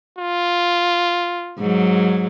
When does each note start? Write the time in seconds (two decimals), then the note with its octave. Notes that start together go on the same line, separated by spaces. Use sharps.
0.19 F4
1.58 G#2 F#3